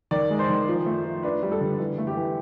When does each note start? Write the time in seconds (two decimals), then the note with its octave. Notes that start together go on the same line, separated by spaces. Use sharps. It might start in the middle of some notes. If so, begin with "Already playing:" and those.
0.11 D#3 D5
0.30 G#3
0.39 C5
0.49 D#3
0.68 F3
0.86 A3
1.04 F3
1.23 D4 B4
1.43 G3
1.52 A4
1.61 D3
1.79 E3
1.98 A3
2.07 G4
2.16 E3